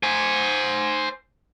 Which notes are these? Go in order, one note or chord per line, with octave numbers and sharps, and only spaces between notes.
C5 G#5